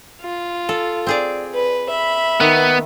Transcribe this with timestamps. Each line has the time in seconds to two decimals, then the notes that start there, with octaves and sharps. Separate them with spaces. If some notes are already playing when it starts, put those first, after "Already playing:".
0.22 F4
0.69 A4
1.07 C4 G#4 D5
1.54 B4
1.89 E5 B5
2.40 D#3 B3